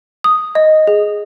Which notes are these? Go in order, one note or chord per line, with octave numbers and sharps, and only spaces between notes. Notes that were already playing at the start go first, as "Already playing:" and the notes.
D#6
D#5
G#4